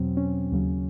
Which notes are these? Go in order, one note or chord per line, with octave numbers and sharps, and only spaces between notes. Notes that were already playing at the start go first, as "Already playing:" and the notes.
Already playing: E2 B2 F#3 C4
C#4
D#2 C#3 F#3